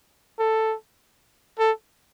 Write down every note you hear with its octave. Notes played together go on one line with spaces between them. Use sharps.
A4
A4